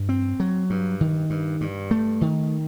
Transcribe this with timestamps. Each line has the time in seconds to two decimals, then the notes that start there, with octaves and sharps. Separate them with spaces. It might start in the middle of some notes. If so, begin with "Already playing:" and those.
Already playing: G2
0.09 C4
0.40 F#3
0.70 G2
1.01 D#3
1.30 G2
1.61 G2
1.91 A3
2.21 D#3